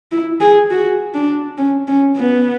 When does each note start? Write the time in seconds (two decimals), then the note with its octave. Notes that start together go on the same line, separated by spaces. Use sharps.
0.12 E4
0.40 G#4
0.71 F#4
1.14 D4
1.58 C#4
1.88 C#4
2.17 B3